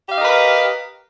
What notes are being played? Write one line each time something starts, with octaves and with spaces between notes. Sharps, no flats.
G4 A#4 B4 D#5 F5